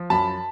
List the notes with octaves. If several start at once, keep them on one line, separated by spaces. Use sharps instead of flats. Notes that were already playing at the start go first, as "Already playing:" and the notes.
Already playing: F3
F#2 A5 B5